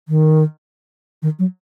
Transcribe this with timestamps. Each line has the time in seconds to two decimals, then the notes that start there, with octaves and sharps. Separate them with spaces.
0.08 D#3
1.22 D#3
1.39 F#3